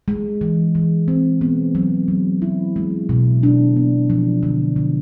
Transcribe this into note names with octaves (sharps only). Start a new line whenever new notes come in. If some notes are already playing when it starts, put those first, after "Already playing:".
G#3
E3
E3
C4
B3
F#3
F#3
E4
G#3
B2
D4
B3
F3
D3
D3